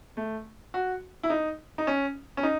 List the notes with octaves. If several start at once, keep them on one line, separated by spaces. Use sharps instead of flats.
A3
F#4
E4
D#4
D#4
C#4
C#4
D#4